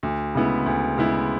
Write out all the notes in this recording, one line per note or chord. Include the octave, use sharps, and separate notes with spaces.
D2
C#3 G#3 B3 E4
D2
C#3 G#3 B3 E4